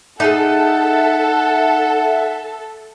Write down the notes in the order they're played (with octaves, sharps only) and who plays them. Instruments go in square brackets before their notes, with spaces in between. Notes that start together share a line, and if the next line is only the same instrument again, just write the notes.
[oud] D#4 F4 G#4 [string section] A4 [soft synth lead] E5 [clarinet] F#5